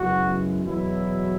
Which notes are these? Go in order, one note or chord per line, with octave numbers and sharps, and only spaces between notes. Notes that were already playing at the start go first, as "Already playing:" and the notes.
Already playing: F#2 C#3 G#3 B3 E4 F#4
E2 B2 F#3 E4